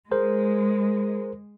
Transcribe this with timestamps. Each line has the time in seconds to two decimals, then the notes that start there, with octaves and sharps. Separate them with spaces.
0.11 G#3 G#4 A#4 C5